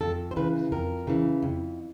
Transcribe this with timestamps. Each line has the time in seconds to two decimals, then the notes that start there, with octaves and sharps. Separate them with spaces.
0.01 F2 A4
0.31 C5
0.36 C#3 E3 B4
0.72 F2 A#4
1.07 C#3 E3
1.42 F2